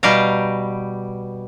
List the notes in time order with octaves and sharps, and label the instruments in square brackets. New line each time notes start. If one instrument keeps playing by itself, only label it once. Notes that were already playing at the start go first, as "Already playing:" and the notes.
[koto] B2 G3 G4 F5 A#5